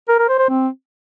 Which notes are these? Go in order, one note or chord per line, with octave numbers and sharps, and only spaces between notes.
A#4
A#4
C5
C5
C4